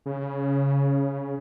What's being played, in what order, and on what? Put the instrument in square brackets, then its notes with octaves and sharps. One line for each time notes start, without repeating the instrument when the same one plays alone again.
[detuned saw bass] C#3